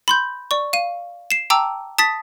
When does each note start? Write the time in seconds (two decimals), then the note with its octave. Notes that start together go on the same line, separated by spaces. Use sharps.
0.08 B5 C6 G6
0.51 D5 C#6
0.73 F5 D#7
1.31 C7 E7
1.50 G5 A5 A#5 D6 E6
1.98 A5 D#6 A6 B6